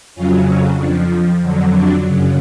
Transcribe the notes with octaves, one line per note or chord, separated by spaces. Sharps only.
F2 C#3 F#3 C#4 F4
C#4
F2 F3 D4
F2 D3 F#3
D4
F#2 C#3 F#3